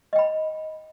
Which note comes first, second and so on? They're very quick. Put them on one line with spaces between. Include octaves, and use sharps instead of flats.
D#5 G5 B5